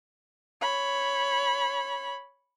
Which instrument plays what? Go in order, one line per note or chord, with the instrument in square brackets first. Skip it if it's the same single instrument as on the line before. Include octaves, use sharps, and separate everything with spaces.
[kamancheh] C#5 B5